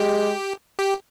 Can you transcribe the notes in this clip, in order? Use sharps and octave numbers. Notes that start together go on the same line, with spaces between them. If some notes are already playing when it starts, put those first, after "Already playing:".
Already playing: G#3 G4
G4